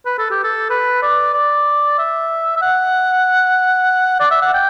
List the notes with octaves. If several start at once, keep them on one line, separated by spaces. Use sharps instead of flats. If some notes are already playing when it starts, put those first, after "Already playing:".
B4
A4
G4
A4
B4
D5
D5
E5
E5
F#5
D5
E5
F#5
G5